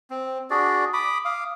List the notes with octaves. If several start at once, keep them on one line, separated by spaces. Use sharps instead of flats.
C4
D4 F#4 G#4 D5
B5 D6 D#6
F5 D6 D#6